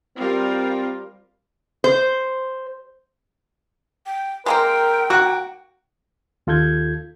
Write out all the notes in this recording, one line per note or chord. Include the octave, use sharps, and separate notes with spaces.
G3 C4 F4 A#4
C5
G5
G#3 A#3 C4 A#4 G5
A#3 F#4 F#6
D#2 F4 A4 G6 G#6